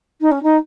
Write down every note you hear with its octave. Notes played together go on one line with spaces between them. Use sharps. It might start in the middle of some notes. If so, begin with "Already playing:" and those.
D#4
C#4
D#4